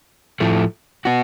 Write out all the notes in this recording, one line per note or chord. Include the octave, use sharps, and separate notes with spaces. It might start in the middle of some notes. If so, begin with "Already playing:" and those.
A2 F3 A3
B3 F#4